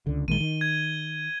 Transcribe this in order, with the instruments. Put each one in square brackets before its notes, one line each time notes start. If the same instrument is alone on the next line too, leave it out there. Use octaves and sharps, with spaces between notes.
[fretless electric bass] C#2 D3
[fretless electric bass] A#1 D#3 G#3 [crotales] D#7 G7
[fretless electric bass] D#3
[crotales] G#6